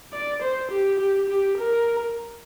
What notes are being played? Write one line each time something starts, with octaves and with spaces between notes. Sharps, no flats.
D5
C5
G4
G4
G4
A#4